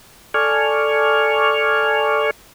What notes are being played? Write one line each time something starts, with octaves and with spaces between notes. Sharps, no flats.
A4 D5 G#5 C#6 F6